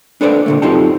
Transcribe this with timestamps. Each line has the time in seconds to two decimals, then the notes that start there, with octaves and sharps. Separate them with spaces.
0.21 D4 A4 B4 C5 D5
0.46 A#2 D3 A3
0.62 F#2 C4 D#4 F4 G4 A4